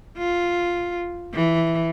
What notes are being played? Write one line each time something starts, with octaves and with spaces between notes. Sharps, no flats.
F4
E3